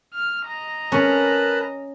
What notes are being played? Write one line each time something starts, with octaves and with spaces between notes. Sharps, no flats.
F6
D#5 A#5
C#4 A#4 B4 A5 B5